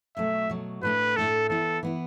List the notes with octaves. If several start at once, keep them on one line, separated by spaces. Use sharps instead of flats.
B2 F#3 A3 E5
B2 F#3 A3
A2 A3 D4 B4
A2 A3 D4 A4
E3 B3 E4 A4
E3 B3 E4